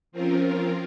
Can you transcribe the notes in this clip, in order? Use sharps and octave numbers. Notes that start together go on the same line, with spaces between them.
F3 C4 C#4 F4 A#4